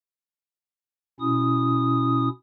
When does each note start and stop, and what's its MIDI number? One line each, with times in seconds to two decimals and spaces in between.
1.20 2.29 47
1.20 2.29 61
1.20 2.29 64
1.20 2.29 87